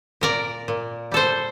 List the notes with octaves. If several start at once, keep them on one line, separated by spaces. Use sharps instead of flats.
A#2 A#4 D5
A#2
G3 A4 C5